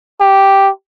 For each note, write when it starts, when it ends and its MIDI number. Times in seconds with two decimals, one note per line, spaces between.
0.21 0.70 67